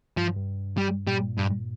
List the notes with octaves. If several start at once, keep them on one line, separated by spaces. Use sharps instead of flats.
G2 F3
G2
G3
A#2 G3
G2